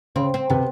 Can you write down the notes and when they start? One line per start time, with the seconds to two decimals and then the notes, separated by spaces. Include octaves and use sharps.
0.16 C#3 C4
0.34 C4
0.50 C3 B3